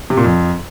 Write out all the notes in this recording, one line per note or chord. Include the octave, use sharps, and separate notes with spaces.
C3
A#2
F2